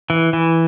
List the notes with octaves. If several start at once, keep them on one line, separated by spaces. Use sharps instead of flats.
E3
E3